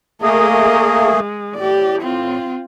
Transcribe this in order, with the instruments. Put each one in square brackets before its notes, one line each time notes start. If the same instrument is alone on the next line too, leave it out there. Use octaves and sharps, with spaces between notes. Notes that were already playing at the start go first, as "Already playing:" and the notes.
[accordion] A3 A#3 G#4 [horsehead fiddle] A#4 D#5
[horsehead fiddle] G#3
[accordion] A2 [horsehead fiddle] G4 D5
[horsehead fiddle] C4 F4